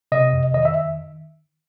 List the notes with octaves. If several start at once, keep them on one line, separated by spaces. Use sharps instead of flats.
C3 D#5
F2
D#3 D#5
E5